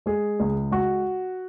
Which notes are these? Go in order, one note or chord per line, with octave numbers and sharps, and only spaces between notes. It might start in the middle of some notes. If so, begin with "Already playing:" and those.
G#3 G#4
C#2
G#3 F#4